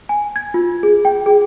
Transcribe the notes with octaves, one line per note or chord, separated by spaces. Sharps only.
G#5
G#6
F4
G#4
G5
G#4